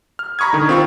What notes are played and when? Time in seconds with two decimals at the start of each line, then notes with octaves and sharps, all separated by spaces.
0.19 F6
0.39 A#5 B5 C#6 D#6 G#6
0.53 D3 D#3
0.69 C4 F4 C#6